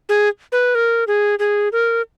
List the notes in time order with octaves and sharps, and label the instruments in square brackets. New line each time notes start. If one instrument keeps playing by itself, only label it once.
[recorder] G#4
B4
A#4
G#4
G#4
A#4